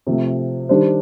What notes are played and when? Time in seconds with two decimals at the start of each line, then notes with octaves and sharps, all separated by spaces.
0.07 C3 F3 A3
0.69 D#3 G3 D4 G4 C5